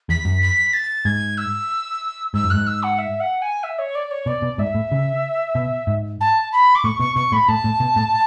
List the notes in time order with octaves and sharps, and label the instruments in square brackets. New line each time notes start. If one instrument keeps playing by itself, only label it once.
[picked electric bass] E2 [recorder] B6
[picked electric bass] F#2
[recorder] B6
A6
[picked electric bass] G#2 [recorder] G#6
[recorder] E6
[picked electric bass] G#2 [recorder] E6
[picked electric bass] F#2
[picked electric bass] G#2 [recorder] F#6
[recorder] E6
F#5
E5
F#5
G#5
E5
C#5
D5
C#5
[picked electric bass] B2 [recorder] D5
[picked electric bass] B2
[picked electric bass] G#2 [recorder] E5
[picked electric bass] A2
C#3
B2
G#2
[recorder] A5
B5
D6
[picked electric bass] A2 [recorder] C#6
[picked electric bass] B2 [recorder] C#6
[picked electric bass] B2 [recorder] C#6
[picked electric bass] A2 [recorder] B5
[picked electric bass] A2 [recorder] A5
[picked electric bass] A2
B2
A2